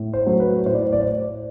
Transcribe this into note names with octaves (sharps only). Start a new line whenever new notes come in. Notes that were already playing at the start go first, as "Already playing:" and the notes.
Already playing: A2
C5
F#3 A3
B4
A2 C5
D5
C5
D5
C5